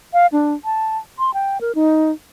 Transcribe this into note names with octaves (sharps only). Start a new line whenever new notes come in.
F5
D4
A5
C6
G5
A#4
D#4